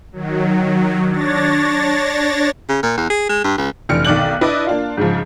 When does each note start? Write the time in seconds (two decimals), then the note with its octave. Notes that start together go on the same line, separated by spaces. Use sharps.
0.13 D#3 F#3
1.08 D4 C#5 A6 A#6
2.69 C#3
2.83 A#2
2.97 E2
3.10 G#4
3.29 G#3
3.44 G2
3.58 C#2
3.89 F1 E3 D4 F6 C#7 D7
4.05 B1 D#3 D5 F#6 F#7
4.41 D4 E4 B4 D5 D#5
4.67 A#3 D4 F4
4.97 G#2 C#3 F3